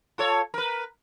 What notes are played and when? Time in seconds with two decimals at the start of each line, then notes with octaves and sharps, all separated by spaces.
0.18 F4 A4 C#5
0.54 A#4 B4